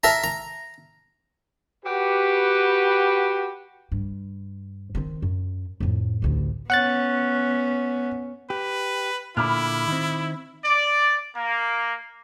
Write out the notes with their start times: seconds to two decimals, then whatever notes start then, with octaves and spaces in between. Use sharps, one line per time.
0.03 A#4 E5 A5 A#5
0.24 A#5
1.85 F#4 G4 B4
3.92 G2
4.95 D#3 C4
5.22 F#2
5.80 F2 A2
6.22 A1 D2
6.70 B3 C#4 F#5 F#6 A6
8.50 G4 B4
9.37 A#2 D3 E4 B5 D6 F6
9.88 D#3 C4
10.65 D5
11.37 A#3